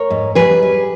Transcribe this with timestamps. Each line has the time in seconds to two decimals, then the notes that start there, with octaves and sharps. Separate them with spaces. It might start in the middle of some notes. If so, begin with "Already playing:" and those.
Already playing: A#4 C#5
0.10 G#2
0.35 G3 G#4 B4
0.62 G3